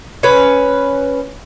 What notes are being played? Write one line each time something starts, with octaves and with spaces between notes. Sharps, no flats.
C#4 B4